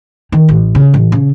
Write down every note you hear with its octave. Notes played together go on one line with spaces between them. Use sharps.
D#3
A1
C#3
A1
C#3